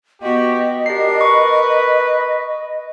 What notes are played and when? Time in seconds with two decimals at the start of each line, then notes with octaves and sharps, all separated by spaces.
0.22 B3 F#4 G4 D#5
0.86 D4 G4 A#4 C7
1.21 B4 C#6